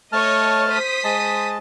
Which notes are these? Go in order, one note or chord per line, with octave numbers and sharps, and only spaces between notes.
A3 C#5 D#5 A5 F6
C5 D#6 B6
G#3 D#5 A5